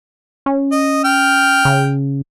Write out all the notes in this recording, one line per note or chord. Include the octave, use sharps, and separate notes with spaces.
C#4
D#5
G5 F6
C#3